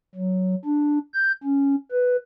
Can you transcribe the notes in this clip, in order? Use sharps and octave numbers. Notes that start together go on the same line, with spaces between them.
F#3
D4
G6
C#4
B4